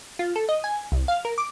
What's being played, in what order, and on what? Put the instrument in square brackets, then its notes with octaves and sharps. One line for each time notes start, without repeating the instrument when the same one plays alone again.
[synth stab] F4
A4
D#5
G#5
C2
F5
A#4
D6